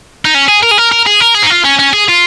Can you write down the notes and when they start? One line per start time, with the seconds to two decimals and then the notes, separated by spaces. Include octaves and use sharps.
0.25 D#4
0.35 C#4
0.48 G#4
0.63 A#4
0.71 G#4
0.78 A#4
0.92 A#4
1.06 G#4
1.20 A#4
1.34 G#4
1.43 D#4
1.50 F4
1.65 C#4
1.79 C#4
1.93 G#4
2.08 F4